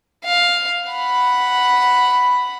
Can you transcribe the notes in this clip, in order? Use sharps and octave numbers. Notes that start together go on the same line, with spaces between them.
F5
F#5 B5